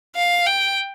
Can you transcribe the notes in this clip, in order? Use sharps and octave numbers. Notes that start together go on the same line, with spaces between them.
F5
G5